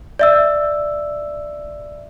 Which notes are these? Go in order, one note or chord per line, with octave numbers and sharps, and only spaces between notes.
D5 E5 E6